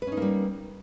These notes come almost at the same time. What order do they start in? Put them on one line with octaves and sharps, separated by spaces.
B4 C#4 D#4 A#3 G3